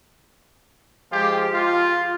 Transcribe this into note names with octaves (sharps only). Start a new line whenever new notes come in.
F3 G#3 F4 G4
F4